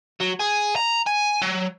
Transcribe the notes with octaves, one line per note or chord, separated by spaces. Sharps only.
F#3
G#4
A#5
G#5
F#3